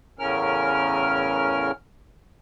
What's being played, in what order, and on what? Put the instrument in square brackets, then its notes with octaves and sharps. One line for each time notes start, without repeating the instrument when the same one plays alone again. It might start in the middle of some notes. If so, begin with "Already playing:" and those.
[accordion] E2 A2 C#3 C#4 A#4 F6